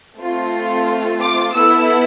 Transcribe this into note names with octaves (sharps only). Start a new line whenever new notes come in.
A3 C4 F4
D6
B3 E4 A4 E6